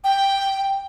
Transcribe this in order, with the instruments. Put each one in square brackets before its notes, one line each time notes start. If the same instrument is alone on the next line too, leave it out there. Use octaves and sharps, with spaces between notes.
[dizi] G5